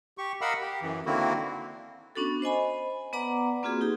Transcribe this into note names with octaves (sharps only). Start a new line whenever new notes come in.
G4 C#6
A#4 D#5 F5 F#5 B5 E6
G4
F#2 E3
D3 D#3 A#3 C4 E4 F#4
B3 C#4 D4 F#4 A4
C5 D#5 G#5 B5
B3 B4 D5 F#5 A#5 D6
A#3 C4 F4 F#4 G#4
D#4 G4 G#4